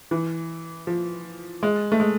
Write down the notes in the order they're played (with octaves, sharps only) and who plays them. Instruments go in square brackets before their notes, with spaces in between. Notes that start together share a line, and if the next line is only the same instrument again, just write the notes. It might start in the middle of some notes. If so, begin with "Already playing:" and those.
[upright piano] E3
F3
G#3
A3
G#3